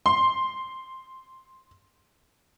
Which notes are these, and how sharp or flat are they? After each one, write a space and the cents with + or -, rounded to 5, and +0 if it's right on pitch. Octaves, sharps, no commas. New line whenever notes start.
C6 +0